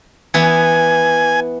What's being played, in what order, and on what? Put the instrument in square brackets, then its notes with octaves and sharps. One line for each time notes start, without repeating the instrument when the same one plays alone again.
[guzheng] E3 B3 [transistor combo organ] G#5